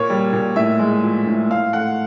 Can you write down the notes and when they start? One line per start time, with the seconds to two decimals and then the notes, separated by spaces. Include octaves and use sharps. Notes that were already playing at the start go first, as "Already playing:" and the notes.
Already playing: A#2 A#3 C#5
0.10 G3
0.33 A#2
0.56 A2 E5
0.79 G#3
1.03 F3
1.27 A2
1.50 A2 F5
1.73 A3 F#5